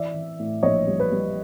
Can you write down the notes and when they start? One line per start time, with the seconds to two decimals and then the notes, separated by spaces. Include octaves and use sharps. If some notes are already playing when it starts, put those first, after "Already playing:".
Already playing: E3 D5 E5
0.14 E3
0.40 A2
0.63 A#1 C#5 D#5
0.87 G3
1.00 B4
1.12 G3